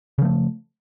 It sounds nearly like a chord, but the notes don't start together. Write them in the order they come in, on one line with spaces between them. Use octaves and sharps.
C#3 F3 A3